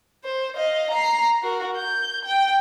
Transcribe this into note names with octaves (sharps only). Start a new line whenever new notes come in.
C5
D#5 F5
A#5 C7
F#4 A#4
G6
G5